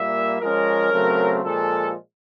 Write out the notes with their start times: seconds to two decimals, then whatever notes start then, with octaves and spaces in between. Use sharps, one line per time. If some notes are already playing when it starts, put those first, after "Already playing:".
Already playing: A#2 G3 A#3 E5
0.41 F3 G#3 C#4 A#4
0.92 C#3 F#3 A3 C4
1.43 A#2 F3 G#3 A4